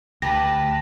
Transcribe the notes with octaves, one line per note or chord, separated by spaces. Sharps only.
D2 G4 B4 A5 A#6